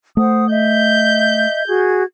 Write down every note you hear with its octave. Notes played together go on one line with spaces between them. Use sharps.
A3 C5 F#5 D#6
D#5 E5 G6
F#4 G#4 G#6